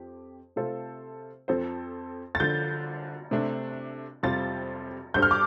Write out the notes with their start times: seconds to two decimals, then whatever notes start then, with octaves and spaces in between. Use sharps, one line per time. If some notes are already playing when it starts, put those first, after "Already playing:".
Already playing: F2 F3 G4
0.56 C3 A3 F4 A4 C5
1.48 F2 F3 C4 A4 C5
2.35 A6
2.40 D3 F3 D4 G6
3.31 C3 A3 D4
4.23 F2 C3 G3 F4 C5 A6
5.14 G2 G3 D4 A4 C5 G6
5.22 F6
5.31 D6